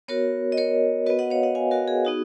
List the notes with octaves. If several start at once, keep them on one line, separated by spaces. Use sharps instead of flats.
B3 F#4 A#4 C#5
D#5
A#4 C#5
B3 F#4 B4 D#5
D#5 F#5
C#5 F5
D#5 F#5
F5 G#5
F#4 A#4
G#4
B3 D#4 F#4